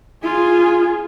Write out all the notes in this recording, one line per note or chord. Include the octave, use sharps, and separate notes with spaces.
F4 G#4